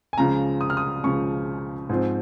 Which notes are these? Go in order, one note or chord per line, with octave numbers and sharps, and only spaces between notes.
G#5
C#2 C#3 F3 A#5
D#6
F6
D#6
C#2 C#3 F3 C#6
G#2 F3 C4